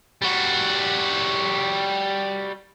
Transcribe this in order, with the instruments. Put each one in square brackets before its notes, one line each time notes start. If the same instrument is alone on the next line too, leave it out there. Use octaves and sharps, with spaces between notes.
[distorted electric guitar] G3 F#4